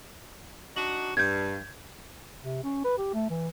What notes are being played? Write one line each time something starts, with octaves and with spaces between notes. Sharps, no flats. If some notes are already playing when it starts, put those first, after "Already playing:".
D4 D#4 F#4 F#7
G2 G6 G#6
C3
C#4
B4
G4
A3
E3